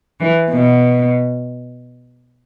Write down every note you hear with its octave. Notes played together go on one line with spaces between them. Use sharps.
E3
B2